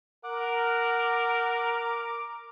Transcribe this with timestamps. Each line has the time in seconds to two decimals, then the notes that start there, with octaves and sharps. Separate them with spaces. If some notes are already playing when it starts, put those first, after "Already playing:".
0.24 A#4 F#5 D6